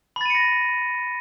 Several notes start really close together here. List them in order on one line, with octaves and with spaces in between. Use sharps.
B5 A6 D#7 C#7 A#6